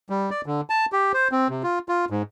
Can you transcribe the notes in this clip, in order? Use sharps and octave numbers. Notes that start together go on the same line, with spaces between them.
G3
D5
D3
A5
G4
C5
C4
C3
F4
F4
G#2